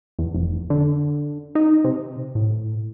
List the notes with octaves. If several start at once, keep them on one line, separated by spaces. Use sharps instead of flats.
E2
F1
D3
D#4
C3
A2